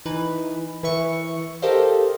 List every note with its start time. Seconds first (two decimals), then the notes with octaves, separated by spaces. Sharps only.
0.06 E3 D#4 B4
0.83 E3 B4 E5 C#6 C#7
1.62 G4 A4 A#4 C5 D#5 F5